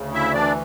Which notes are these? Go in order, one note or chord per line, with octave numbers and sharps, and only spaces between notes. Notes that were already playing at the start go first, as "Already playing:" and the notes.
Already playing: D2 C#3
E4 E5
E3 D4 D5